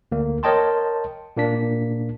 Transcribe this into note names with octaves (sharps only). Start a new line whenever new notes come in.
D2 A#3
A#4 C#5 D#5 G5 A5 C6
A#2 A#3 D4 B6